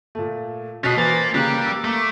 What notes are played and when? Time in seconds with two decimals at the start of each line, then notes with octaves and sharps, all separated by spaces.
0.15 A#2 A3
0.84 B2 C#4 D#5 F#6 A6 B6 C7
0.97 E3 A#3 C5 A6
1.34 C#3 G3 A#3 G4 F#6
1.66 D6 E6
1.84 A3 A#3